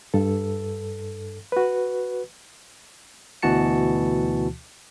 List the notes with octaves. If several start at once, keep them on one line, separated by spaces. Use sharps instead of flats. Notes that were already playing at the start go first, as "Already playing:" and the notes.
G2 A4
F#4 B4
D2 B2 E3 F#4 A5 C#7